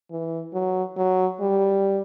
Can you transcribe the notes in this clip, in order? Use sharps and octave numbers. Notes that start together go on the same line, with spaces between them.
E3
F#3
F#3
G3